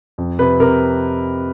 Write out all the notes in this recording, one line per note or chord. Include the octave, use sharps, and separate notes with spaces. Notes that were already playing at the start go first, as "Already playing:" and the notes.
F2
C3 B4
C3 A#4